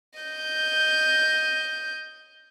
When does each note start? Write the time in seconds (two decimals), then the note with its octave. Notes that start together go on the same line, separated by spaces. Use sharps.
0.19 D#5 G6